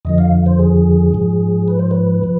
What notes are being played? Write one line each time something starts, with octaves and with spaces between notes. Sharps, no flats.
F2 D3 F3 D#5
F5
C5
G#4
G#2 F3
B4
C5
B4
F3